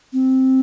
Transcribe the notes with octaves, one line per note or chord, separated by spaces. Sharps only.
C4